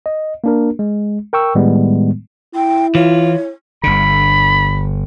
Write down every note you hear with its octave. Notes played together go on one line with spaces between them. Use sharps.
D#5
A#3 D4 A#4
G#3
A#4 G5 C#6 E6
A2 D#3 G3 G#3 B3
E4 G5
E3 F4 C#5
G1 D3 B5